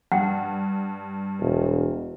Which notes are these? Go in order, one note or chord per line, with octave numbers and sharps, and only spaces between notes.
G2 F#5 G5
E1